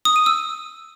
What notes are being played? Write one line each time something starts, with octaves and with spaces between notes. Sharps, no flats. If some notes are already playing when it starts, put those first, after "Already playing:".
D#6
D#7
E6